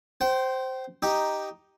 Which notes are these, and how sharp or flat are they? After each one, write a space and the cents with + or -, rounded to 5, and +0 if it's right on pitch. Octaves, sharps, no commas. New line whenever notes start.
C5 +0 G5 -30
D#4 +0 G4 +0